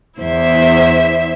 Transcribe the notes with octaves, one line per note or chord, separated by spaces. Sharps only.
E2 E4 C5 E5